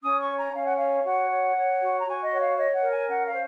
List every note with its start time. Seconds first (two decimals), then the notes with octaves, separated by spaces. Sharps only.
0.01 C#4 D#6
0.19 C#6
0.27 C#5
0.36 A#5
0.52 C#4 F5
0.63 F#5
0.74 C#5 F5
1.03 F#4 F#5
1.29 C#5
1.54 C#5
1.79 F#4
1.98 A#5
2.05 F#4 G#5
2.22 D#5
2.30 C#5 F#5
2.39 F5
2.55 C#5 D#5
2.72 F#5
2.81 A#4
2.90 G#5
3.06 C#4 F#5
3.24 F5
3.31 C5